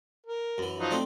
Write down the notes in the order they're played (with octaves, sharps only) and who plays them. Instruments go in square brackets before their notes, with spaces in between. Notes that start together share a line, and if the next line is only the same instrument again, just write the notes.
[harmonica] A#4
[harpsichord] F#2 E3
[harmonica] F3 F#3 D#4
[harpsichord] A3 C4 D4